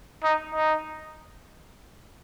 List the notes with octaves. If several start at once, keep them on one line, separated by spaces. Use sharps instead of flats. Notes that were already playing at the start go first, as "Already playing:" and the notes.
D#4
D#4